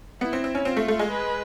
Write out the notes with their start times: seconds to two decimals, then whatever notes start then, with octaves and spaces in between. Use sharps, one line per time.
0.21 B3 E4
0.33 C4
0.44 C4
0.55 C#4
0.65 C4 F4
0.77 A3
0.88 A3
0.99 G#3
1.10 B4